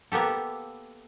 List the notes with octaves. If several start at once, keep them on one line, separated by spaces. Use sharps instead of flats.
A#3 B3 G4 A4